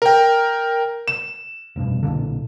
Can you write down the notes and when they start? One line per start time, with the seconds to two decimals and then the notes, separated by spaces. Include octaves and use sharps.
0.02 A#4 G5
1.08 E7
1.76 F1 G2 B2
2.03 B1 A#2 D3